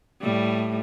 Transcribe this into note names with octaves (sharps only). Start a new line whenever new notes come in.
A2 G3